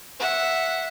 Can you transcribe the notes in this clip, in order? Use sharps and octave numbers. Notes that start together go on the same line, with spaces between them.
E5 F#5